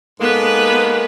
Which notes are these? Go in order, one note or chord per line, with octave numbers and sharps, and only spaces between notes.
G#2 G#3 A#3 B3 A4 B4